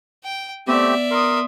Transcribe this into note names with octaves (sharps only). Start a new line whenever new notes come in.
G5
A3 B3 C4 G4 D5 E5
A#4 C6 D#6